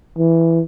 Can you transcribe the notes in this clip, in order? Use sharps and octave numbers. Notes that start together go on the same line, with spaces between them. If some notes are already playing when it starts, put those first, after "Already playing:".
E3